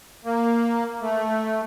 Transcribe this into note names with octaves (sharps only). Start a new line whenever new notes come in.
A#3
A3